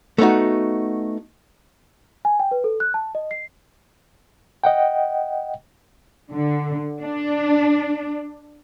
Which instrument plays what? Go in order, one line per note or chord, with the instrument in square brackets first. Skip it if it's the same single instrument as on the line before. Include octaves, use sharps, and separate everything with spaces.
[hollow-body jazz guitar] A3 B3 D#4 F#4
[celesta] G#5
G5
B4
A4
F#6
A5
D#5
C7
[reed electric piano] D#5 F#5 G5
[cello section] D3
D4